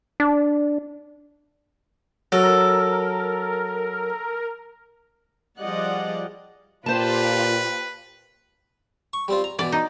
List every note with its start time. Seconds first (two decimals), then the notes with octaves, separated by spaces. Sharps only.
0.20 D4
2.32 F#3 A4 A#4
5.59 F3 G3 G#4 D5 D#5 F#5
6.86 A#2 F4 G4 B4 C5 A5
9.13 C#6
9.28 G3 C4 F4
9.44 A#5
9.59 B2 E3 D5
9.72 D#4